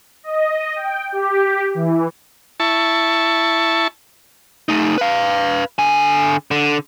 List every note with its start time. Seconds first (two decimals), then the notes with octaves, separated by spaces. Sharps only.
0.24 D#5
0.76 G5
1.12 G4
1.74 E3
2.60 E4 A5 C#6
4.69 A3 D#4
4.98 B4 F5
5.79 D3 G#5
6.51 D3